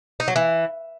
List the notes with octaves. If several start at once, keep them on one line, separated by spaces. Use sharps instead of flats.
D#4
F#3
E3